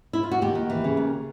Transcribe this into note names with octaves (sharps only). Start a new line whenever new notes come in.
E4
F4
F#4
D#2 G4
D#2
E3
C#3
D#2